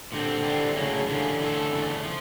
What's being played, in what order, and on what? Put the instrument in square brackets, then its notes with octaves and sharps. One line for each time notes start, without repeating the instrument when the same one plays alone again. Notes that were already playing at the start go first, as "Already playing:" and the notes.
[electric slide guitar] A#2 G3 C4 [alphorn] D3
[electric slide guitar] E3 G3 C4
[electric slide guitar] A2 F#3 A#3 [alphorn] C#3
[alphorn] D3 [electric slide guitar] E3 G3 A#3 C#4
[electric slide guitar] E3 A3 C#4 F4 A4
E2 C#3 E3 A3
F3